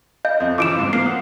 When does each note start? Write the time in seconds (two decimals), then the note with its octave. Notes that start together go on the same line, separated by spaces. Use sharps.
0.25 D#5 F5 G6
0.40 F2
0.58 C#3 E3 F3 D6 D7 E7
0.79 G#2
0.93 A#3 C7
1.06 F#5 D#6